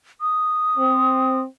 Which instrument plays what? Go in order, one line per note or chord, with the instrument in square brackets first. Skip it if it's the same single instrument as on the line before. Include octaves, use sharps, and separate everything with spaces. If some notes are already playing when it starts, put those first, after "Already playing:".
[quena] D#6
[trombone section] C4